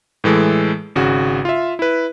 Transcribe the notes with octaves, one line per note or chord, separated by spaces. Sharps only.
A2 E3 G#3 A4
G#1 C#3 F#4
F4 E5
E4 B4